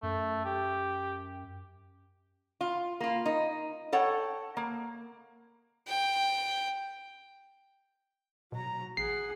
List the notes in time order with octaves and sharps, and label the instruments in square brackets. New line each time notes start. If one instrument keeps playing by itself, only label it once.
[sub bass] F#2 [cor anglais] A3
[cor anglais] G4
[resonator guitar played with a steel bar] F4
A#3 F4
D#4
A4 C#5 F#5 G5
A#3
[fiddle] G5
[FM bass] B2 [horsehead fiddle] F#3 A#5
[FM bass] A1 [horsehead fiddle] G#4 F#5 [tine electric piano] C7